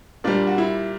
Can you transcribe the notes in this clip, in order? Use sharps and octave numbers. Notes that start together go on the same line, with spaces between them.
A#2 G3 D4
F#4
E4